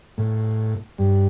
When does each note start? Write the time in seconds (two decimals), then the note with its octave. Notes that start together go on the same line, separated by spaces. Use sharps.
0.18 A2
0.98 G2